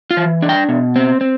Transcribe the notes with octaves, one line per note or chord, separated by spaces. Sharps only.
F4
E3
D4
G5
B2
C4
C4